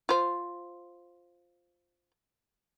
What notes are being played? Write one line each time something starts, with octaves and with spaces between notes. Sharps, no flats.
F4 C5